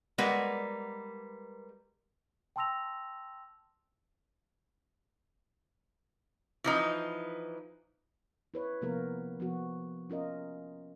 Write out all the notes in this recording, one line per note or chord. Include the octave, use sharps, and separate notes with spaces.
G3 G#3 A#3 B4 F#5
G5 A5 C6 E6 A#6 F7
E3 F3 D#4
E4 B4 C#5
C3 F3 A#3 B3 F4 A#4
F3 B3 F#4
C#4 F4 A#4 D#5